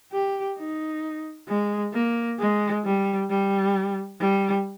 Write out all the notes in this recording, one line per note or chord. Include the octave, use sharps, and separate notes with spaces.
G4
D#4
G#3
A#3
G#3
G3
G3
G3